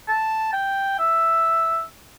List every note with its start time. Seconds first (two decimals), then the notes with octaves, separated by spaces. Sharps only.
0.08 A5
0.53 G5
0.99 E5